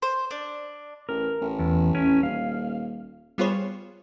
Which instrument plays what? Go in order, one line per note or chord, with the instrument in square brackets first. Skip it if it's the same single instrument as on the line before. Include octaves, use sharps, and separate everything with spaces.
[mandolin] C5
D4
[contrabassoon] A1 [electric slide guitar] A#4
[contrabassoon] A1
[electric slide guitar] E2
C#4 E4
[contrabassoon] D#1 [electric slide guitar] F5
[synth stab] G3 B3 F4 G#4 C5 C#5